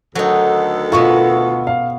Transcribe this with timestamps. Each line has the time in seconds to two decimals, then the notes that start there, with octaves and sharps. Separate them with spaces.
0.15 D2 D#3 F#3 D#4 A4
0.92 B2 B3 E4 F4 C#6
1.67 F5